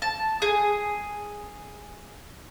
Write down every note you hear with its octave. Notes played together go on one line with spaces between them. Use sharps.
A5
G#4